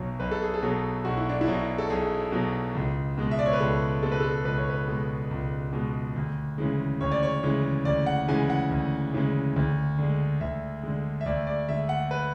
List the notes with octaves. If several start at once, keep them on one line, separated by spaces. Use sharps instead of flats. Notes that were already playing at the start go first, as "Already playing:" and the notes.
Already playing: B1 B2 F#3
B1 B4
A4
G#4
A4
B2 F#3
B1 F#4
E4
D4
E4
B2 F#3
A4
B1 G#4
B2 F#3
C#2
B2 G#3
E5
D5
C#5
B4
C#2 A4
B2 G#3 A4
B4
A4
C#2 B4
C#5
B4
B2 G#3
C#2
B2 G#3
D2
C#3 E3 G#3
D2 C#5
D5
C#5
C#3 E3 G#3
D2 D5
F#5
C#3 E3 G#3 G#5
F#5
D2
C#3 E3 G#3
D2
D3 G#3
D2 E5
D3 G#3
E5
D2 D5
D5
D3 G#3 E5
F#5
B4